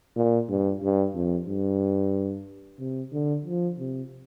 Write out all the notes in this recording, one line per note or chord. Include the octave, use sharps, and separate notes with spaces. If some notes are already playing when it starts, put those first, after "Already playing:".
A#2
G2
G2
F2
G2
C3
D3
F3
C3